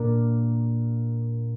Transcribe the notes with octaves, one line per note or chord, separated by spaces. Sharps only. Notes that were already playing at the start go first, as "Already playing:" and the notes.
Already playing: A#2 A#3 D4 D5